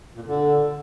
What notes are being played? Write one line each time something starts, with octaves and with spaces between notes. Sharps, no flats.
A#2
F2
D3